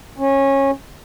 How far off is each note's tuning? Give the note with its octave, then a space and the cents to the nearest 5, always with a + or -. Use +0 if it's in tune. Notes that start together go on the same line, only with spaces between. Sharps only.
C#4 -20